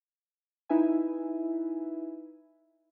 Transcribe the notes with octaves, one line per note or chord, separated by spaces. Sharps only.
D#4 E4 B4 E5 G#5